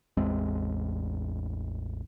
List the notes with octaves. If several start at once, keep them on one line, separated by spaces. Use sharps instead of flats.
A1 E2 G#3 C4